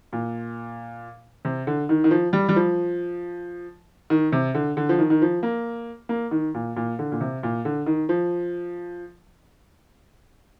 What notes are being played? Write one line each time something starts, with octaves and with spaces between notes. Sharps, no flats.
A#2
C3
D3
D#3
D#3
F3
G3
G3
F3
D#3
C3
D3
D3
F3
D#3
D#3
F3
A#3
A#3
D#3
A#2
A#2
D3
A#2
C3
A#2
D3
D#3
F3